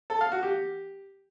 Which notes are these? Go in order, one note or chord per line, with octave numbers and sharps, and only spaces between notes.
A4
F5
F#4
G4